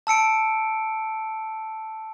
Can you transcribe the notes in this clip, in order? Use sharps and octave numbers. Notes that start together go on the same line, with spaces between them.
A5 E6 C#7 D7